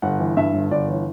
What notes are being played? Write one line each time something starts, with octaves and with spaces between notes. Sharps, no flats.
G1 F#5
E3
G2 E5
G1
G1 D5
E3 C#5